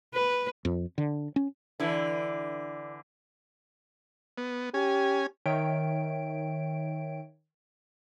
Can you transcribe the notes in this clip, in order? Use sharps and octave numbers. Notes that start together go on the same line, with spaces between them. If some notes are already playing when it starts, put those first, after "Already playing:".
B4
F2
D3
C#4
D3 E3 D4 E4 B4
B3
C#4 G4 G#5
D#3 C#5 E5 G5 D7